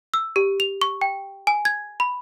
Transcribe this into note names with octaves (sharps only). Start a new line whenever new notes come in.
E6
G4
F7
C#6
G5
G#5
G#6
B5